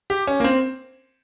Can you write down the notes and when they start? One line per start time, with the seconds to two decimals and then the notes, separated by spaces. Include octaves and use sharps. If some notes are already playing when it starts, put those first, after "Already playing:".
0.10 G4
0.27 C#4
0.40 A#3
0.44 C4